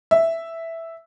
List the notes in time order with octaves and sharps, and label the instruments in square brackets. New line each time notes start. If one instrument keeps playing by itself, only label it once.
[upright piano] E5